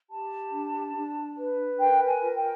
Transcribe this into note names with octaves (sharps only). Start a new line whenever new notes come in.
G4 A5
D4
D4
B4
A#4 G5
G#5
F4
G5